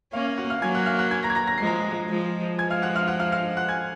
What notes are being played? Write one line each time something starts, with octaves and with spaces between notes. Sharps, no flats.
A#3 C#4 F5
F5
F#4 F#5
F5 F6
F#3 A#3 G#5 G#6
F#5 F#6
F5 F6
F#5 F#6
G#5 G#6
A#5 A#6
G#6
A#5 A#6
A#6
F3 G#3 C7
A#5 A#6
F3 G#3
F3 G#3 G#5 G#6
F5 F6
F#5 F#6
F5 F6
F#5 F#6
F5 F6
F5 F6
F#5 F#6
G#5 G#6